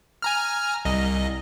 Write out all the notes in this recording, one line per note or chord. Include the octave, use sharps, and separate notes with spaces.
G#5 A#5 F6
C2 D#5